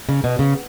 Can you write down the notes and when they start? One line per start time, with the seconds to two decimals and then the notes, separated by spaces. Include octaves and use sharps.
0.09 C#3
0.24 B2
0.39 C#3